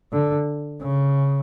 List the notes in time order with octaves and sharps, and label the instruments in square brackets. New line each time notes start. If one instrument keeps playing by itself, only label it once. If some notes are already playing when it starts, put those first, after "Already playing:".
[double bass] D3
C#3